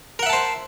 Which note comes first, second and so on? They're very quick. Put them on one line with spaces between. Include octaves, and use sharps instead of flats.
A#4 F#5 E5 A5 C5